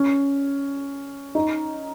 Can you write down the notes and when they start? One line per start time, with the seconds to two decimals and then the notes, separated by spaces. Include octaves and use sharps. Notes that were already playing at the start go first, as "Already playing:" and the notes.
Already playing: C#4
1.35 D#4